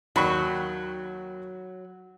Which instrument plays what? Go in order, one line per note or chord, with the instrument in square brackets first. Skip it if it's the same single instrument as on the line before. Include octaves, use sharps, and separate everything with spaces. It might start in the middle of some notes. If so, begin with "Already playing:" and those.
[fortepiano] D#2 B5 C#6 [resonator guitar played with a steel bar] F#3